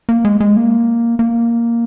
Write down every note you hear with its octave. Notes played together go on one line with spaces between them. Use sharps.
A#3
G#3
G#3
A#3
A#3